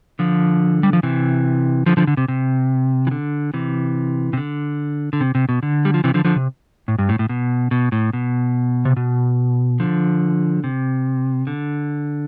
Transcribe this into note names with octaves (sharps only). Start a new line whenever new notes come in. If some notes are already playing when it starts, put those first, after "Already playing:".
D3 F3
G3
F3
C3 E3
D3 F3
D3 F3
D3
C3
C3
E3
D3
C3 E3
C3
D3
D3
C3
C3
B2
D3
G3
F3
C3 E3
D3 F3
D3 F3
C3
A2
G2
A2
A2
B2
B2
A2
B2
C3
B2
D3 F3
C3
D3